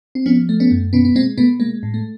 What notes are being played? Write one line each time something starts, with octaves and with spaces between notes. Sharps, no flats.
C4
F3 B3 C#4
A3
B3 C#4
F#2
B2 B3 C#4
B3
G#3 A#3 C4
B2 A3 B3
G#3 A#3
A2
A3